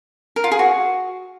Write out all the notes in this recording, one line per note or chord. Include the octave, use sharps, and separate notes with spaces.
A#4
F4
G#4
F#4